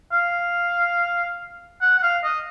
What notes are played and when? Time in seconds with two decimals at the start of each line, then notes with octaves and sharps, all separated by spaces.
0.12 F5
1.81 F#5
1.98 F#5
2.03 F5
2.24 D#5